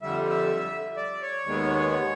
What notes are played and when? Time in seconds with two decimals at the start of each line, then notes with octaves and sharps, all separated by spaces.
0.02 F2 D3 G3 E5
0.30 E5
0.97 D5
1.22 C#5
1.45 D#2 D#3 G#3 B3